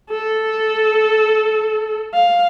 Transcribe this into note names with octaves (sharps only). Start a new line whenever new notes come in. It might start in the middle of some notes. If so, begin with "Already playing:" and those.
A4
F5